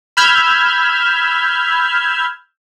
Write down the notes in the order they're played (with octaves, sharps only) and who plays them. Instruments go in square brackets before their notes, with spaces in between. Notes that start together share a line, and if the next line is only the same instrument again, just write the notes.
[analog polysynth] B5 E6 F6 G6 G#6